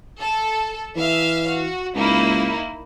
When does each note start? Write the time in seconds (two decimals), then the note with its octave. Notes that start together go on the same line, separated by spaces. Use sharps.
0.20 A4
0.96 E3 E5 F5
1.48 F#4
1.95 C#2 A#3 D#4 E4